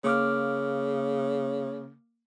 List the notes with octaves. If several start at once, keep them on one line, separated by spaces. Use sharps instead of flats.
C#3 A#3 D6 F6